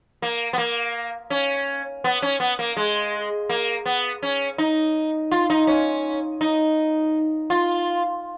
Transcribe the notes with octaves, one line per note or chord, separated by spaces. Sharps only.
A#3
B3
A#3
C#4
B3
C#4
B3
A#3
G#3
A#3
B3
C#4
D#4
F4
D#4
C#4
D#4
F4